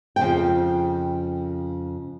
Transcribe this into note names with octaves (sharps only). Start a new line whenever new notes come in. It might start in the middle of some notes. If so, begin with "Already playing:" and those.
F2 C#3 G5